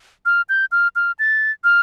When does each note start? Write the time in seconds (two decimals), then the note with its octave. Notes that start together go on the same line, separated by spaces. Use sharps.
0.26 F6
0.49 G6
0.72 F6
0.96 F6
1.19 A6
1.64 F6